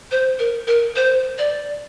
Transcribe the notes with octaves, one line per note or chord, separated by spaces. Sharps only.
C5
A#4
A#4
C5
D5